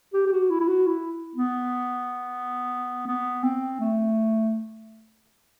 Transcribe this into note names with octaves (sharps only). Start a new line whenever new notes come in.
G4
G4
F#4
E4
E4
F#4
E4
B3
B3
C4
A3